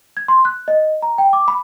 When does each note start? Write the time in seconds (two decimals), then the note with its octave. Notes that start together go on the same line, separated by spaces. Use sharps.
0.17 G#6
0.28 C6
0.45 F#6
0.68 D#5
1.02 A#5
1.18 G5
1.33 D6
1.48 B5